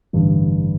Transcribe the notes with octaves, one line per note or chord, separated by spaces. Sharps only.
A1 G2 D3